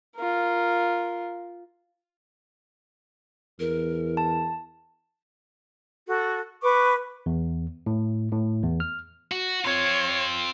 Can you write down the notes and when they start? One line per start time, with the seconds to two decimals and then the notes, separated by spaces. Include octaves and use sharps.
0.16 F4 A#4
3.60 E2 A#4
4.17 A5
6.07 F#4 A4
6.61 B4 C#6 D6
7.26 E2
7.86 A2
8.32 A2
8.63 E2
8.80 F6
9.32 F#4
9.65 C4 F4 C#5